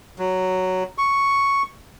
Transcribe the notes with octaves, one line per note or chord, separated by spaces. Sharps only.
F#3
C#6